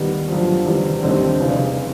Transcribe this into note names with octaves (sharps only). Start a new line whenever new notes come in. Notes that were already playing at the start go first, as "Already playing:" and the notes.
Already playing: D#2 D#3 G3 B3
F#2 D3 F3
E2 C3 D#3 G3
D#2 D3 G3 C4 D#4
F1 E2 C#3 E3